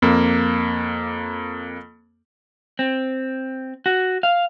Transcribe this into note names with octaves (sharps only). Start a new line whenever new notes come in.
F2 A#3
C4
F#4
F5